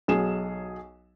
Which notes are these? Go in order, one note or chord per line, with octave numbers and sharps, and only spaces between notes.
B1 F#3 G#4 E7